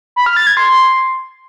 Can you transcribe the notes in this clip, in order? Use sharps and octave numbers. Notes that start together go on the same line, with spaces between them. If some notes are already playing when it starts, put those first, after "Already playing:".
B5
F6
A6
G#6
C6